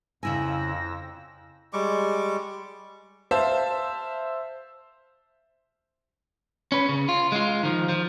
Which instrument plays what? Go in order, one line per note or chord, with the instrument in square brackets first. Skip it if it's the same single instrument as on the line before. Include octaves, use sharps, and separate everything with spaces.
[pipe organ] F2 E6 A#6 [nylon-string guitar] C#3 E4 G#5
[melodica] G3 G#3 C#6 D6
[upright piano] C5 E5 F5 A5
[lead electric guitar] C#4 B4
C#3
F4
G#3 F4
D#3 F3
F3